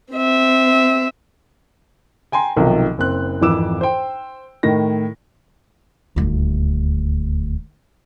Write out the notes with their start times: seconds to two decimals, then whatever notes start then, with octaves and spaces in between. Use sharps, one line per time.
0.13 C4 E5
2.32 G5 G#5 A#5 C6
2.57 B1 C3 D#3 F3
2.98 F#1 C4 F#6
3.41 G#1 F2 E3 D6 E6 E7
3.81 C5 G5
4.63 A2 D#3 A#6
6.16 D#1 D2